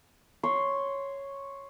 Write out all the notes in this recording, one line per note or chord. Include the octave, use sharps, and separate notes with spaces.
C#5 C6